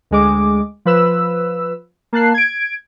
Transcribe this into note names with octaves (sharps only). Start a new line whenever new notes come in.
D2 G#3 D6
F3 B4 E6
A#3 A5 F#6 C7
G#6 D7